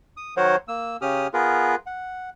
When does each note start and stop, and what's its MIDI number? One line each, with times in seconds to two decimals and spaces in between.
0.17 0.34 87
0.37 0.56 51
0.37 0.56 54
0.37 0.56 70
0.37 0.56 72
0.37 0.56 73
0.37 0.56 78
0.68 0.97 58
0.68 0.97 88
1.01 1.27 49
1.01 1.27 61
1.01 1.27 67
1.01 1.27 87
1.01 1.27 89
1.33 1.75 59
1.33 1.75 65
1.33 1.75 68
1.33 1.75 70
1.33 1.75 71
1.86 2.30 78